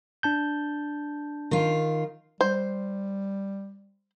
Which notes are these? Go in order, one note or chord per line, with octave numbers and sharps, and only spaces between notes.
D4 A5 G6
D#3 F4
G3 C5